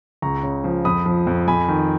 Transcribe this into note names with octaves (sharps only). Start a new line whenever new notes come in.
C#2 A#5 C#6
C#3
F3
F2 B5 D#6
F3
F2
F2 G#5 B5
D#3